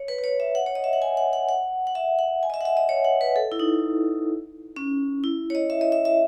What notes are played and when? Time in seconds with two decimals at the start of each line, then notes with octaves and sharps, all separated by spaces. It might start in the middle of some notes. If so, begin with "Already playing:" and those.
Already playing: C#5
0.08 B4
0.19 B4
0.24 C#5
0.40 E5
0.55 F#5
0.66 C#5
0.75 D#5
0.84 E5
0.93 F#5
1.02 G#5
1.17 F#5
1.33 F#5
1.49 F#5
1.87 F#5
1.95 E5
2.19 F#5
2.43 G#5
2.50 D#5
2.54 E5
2.61 F#5
2.65 E5
2.77 D#5
2.89 C#5
3.05 F#5
3.21 B4
3.36 A4
3.52 E4
3.59 D#4
4.76 C#4
5.24 E4
5.50 C#5
5.55 D#5
5.70 E5
5.81 D#5
5.92 E5
6.05 E5